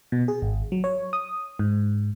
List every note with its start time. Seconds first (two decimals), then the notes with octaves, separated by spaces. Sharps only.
0.12 B2
0.28 G#4
0.42 G#1
0.72 F#3
0.84 C#5
1.13 D#6
1.59 G#2